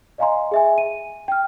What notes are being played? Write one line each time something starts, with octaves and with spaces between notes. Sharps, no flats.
D5 D#5 F5 G#5 A#5 C6
G#4 E5 G#5
D#7
G5 F6